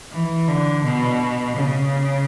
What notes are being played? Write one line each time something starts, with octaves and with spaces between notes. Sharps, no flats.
E3
D3
B2
C#3